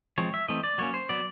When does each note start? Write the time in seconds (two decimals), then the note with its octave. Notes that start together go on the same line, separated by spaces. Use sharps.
0.18 F3 G#3 C4 C#5
0.34 E5
0.48 E3 A3 C4 D#5
0.64 D5
0.78 F#3 A#3 C#4 C#5
0.94 C5
1.09 F#3 B3 D5